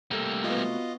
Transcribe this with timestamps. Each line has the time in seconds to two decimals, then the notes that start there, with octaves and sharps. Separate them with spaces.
0.11 C3 G3 A3 A#3 A4
0.44 B3 F4 F#4 D#5